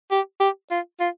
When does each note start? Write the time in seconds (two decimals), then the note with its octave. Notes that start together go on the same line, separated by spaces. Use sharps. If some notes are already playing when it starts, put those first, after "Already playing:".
0.11 G4
0.40 G4
0.71 F4
1.00 F4